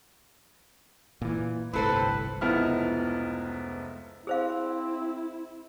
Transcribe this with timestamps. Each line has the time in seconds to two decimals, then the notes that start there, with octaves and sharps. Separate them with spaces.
1.22 A#2 E3
1.73 G1 C2 A2 C4 A4 B4 C5
2.41 F1 C#2 F3 B3 E4 F6
4.27 C4 E4 G#4 C5 F5